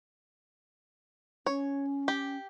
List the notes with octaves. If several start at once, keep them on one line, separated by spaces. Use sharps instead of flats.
C#4 C#5
G4